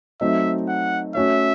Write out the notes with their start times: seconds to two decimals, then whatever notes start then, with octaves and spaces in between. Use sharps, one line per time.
0.21 F#3 A3 C4 D#4 E5
0.68 F#5
1.15 A3 C#4 F#4 C#5 E5